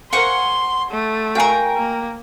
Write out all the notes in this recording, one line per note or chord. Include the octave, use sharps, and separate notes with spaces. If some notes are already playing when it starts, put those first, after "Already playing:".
A#4 C5 F5 F#5 G#5 C6 C#6
A3
F#4 A#4 F5 G5 G#5
A#3